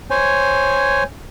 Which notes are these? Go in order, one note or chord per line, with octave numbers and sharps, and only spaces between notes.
C5 C#5 G#5